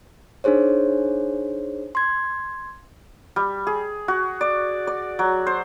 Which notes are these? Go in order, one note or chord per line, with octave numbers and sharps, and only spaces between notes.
D4 D#4 G#4 C5 C#5
C6 G#6
G3
G#4
F#4
D5
D5
F#3
C5